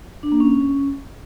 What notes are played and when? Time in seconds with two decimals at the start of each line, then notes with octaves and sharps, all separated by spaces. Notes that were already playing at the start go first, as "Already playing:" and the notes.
0.23 D4
0.32 A#3
0.40 C#4